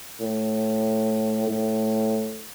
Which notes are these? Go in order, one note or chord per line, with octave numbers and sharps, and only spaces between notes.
A2
A2